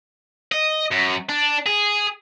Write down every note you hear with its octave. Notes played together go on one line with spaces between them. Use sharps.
D#5
F#2
D4
G#4